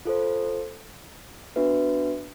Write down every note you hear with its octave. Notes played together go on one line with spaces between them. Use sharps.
F4 A4 C5
B3 D4 F#4 B4 E5